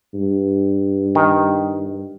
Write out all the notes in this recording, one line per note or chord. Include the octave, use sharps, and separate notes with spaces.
G2
D#3